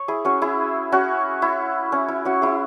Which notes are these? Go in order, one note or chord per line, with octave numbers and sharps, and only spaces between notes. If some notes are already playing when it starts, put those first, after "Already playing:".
Already playing: C#5
E4 G#4
C#4 F#4
E4 G#4
C#4 F#4
E4
C#4
E4
C#4 F#4
E4 G#4